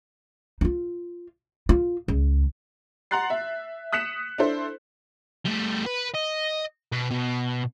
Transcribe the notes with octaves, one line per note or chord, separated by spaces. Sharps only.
D#4 F4
F4
C#2
F#5 A#5 C6 F#6 A6 C7
E5
D#6 F#6 B6 C#7 E7
D4 E4 A4 C5
G3 A3
B4
D#5
B2
B2